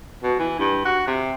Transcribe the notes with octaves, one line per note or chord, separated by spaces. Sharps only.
B2
E3
G2
F#4
C3